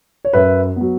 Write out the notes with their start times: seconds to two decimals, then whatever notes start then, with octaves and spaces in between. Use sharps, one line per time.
0.25 C#5
0.33 F#2 B4 E5
0.76 F#3 B3